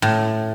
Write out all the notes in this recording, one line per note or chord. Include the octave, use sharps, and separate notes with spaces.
A2